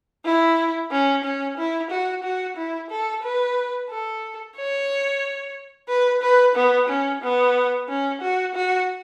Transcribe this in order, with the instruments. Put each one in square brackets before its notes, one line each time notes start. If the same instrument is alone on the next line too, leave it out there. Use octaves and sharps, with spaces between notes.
[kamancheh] E4
C#4
C#4
E4
F#4
F#4
E4
A4
B4
A4
C#5
B4
B4
B3
C#4
B3
C#4
F#4
F#4